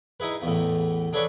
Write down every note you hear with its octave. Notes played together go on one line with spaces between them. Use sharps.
D#4 E4 G#4 B4
E2 A2
D4 G#4 A4 B4 C#5 D5